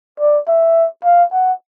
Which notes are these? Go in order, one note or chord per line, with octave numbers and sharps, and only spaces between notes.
D5
E5
F5
F#5